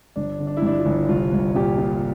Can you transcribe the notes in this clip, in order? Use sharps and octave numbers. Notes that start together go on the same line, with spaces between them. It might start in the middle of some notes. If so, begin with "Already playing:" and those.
G1 D4
D3
D4
E4
G2 D4
F4
G1
C2 F4
C2
A#2 G4
A#2